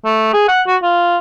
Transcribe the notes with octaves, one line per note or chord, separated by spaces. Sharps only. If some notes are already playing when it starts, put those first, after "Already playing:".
A3
G#4
F#5
F#4
F4